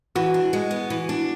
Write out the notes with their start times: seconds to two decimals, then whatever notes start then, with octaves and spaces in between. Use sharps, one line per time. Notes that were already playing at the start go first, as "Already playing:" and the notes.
0.15 E3 F#4
0.34 D4
0.53 G#3
0.71 B3
0.90 E3
1.09 D4